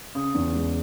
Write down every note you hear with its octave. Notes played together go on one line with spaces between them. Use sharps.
C#3 D#6
E2
G#3